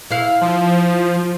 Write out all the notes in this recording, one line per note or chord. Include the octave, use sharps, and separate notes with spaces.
E4 F5
F3